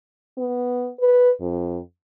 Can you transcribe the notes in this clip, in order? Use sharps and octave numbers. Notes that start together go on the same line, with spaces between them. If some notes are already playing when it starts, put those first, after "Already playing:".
B3
B4
F2